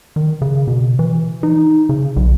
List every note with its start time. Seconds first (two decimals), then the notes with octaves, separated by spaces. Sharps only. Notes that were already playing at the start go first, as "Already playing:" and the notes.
0.16 D#3
0.42 C#3
0.67 B2
0.99 E3
1.43 D#4
1.89 C#3
2.16 B1